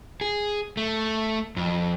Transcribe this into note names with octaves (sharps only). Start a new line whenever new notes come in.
G#4
A3
F2